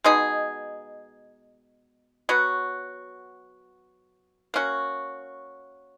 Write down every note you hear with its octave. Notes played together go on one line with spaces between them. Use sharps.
B2 G#3 D#4 G#4
F#3 B3 F#4
A#3 C#4 F#4